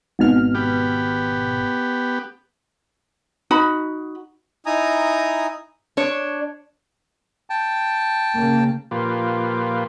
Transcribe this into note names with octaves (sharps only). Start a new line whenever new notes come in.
G#1 B2 F6
B3 G4
D#4 F#4 B5
D#4 E4 G#5 A#5 D#6
D4 C#5
G5 A5
C#3 A#3
A#2 F3 A#3 F4 G4 B4